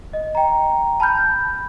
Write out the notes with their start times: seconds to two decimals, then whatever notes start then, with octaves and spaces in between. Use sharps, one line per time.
0.13 D#5
0.35 G5 A#5
1.00 A5 B5 F6 G6